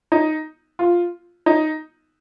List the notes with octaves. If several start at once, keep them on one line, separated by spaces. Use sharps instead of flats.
D#4
F4
D#4